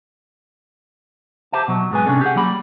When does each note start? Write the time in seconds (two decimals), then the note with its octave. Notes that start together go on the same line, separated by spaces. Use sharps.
1.52 G4 C5 E5 A5
1.68 B2 F#3
1.91 G#2 G#3 B3 G#5
2.06 C3 C#4 D4 A4
2.21 G4 G#4 F#5
2.36 F#3 G3 A#3 B5